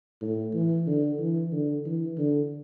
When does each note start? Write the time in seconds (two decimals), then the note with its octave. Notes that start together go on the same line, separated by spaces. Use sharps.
0.22 A2
0.54 E3
0.87 D3
1.19 E3
1.52 D3
1.85 E3
2.18 D3